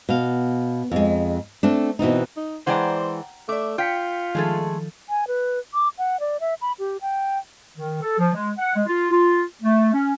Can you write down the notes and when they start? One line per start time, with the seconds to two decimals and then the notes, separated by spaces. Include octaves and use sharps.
0.09 B2 F5
0.91 F2 G#3
1.63 A3 C4 D4
1.99 B2 E3 C4 D#4
2.37 D#4
2.67 E3 G#3 C5 D5 F#5 G5 A#5
3.49 A3 D5 E5 D6
3.78 F4 G5 G6 B6 C#7
4.35 D#3 F3 G#3 A3 G#4 A4
5.09 G#5
5.27 B4
5.74 D6
5.98 F#5
6.20 D5
6.40 E5
6.62 B5
6.79 G4
7.01 G5
7.77 D#3
8.01 A4
8.18 F3
8.33 G#3
8.58 F#5
8.75 G#3
8.87 F4
9.10 F4
9.62 A3
9.93 C#4